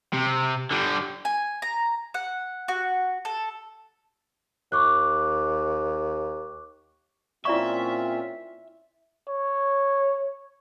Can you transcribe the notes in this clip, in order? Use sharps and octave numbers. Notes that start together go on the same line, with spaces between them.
C3
D3 G3
G#5
A#5
F#5
F#4
A4
D#2 C#6 D6 F#6
A#2 C4 C#4 E4 F4 D5 E5 C#6
C#5